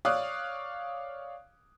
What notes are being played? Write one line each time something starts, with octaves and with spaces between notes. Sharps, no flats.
C#5 D5 F5 D#6 F#6